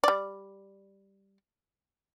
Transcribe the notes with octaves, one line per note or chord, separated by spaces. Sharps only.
G3 D5